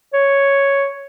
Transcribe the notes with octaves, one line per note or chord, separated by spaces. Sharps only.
C#5